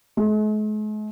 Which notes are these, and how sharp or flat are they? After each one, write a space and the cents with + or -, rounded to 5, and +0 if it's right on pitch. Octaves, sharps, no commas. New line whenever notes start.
G#3 +45